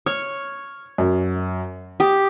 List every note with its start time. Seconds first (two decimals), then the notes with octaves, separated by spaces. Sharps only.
0.06 C#5 F6
0.98 F#2
2.00 G4 D#6